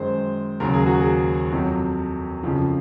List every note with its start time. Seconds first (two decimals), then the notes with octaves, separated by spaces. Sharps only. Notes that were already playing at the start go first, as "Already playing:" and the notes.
Already playing: F#2 D#3 G#3 C5
0.60 D#2 C#3 F#3 A#4
0.74 G#4
0.86 F#4
1.01 G#4
1.52 F2 C3 F#3
2.43 F2 C#3 F3